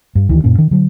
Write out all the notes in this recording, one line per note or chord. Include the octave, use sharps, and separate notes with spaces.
G2
D2 D#3 E3
F#2 A#2 C#4
D#3
D3 F#3